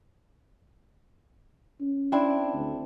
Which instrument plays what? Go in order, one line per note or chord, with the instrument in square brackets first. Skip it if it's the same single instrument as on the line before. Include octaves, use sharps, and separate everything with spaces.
[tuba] C#4
[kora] C4 D4 E4
[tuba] D2